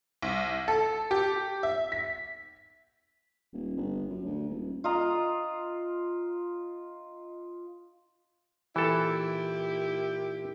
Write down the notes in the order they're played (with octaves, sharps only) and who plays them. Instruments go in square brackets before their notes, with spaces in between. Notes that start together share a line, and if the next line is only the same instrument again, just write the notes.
[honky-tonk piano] C2
A4
G4
E5
B6
[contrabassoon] D#1
G1
F#2
D2
D#1
[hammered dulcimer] F4 D#5 A#5
[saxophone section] A#2 E4 G4 [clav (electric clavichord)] E3 A4